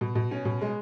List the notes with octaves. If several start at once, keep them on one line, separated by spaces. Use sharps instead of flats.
B2
B2
C#4
B2
G#3